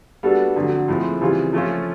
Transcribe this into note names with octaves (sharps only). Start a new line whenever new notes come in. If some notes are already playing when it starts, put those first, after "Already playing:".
G3 B3 D4 F#4 A4
F2 D3 F#3
A2 F3 G#3 C4
C#3 E3 G3 C4 F4
F3 A3 C#4 F4